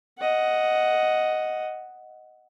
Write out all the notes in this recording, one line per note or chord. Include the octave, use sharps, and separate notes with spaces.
D#5 F#5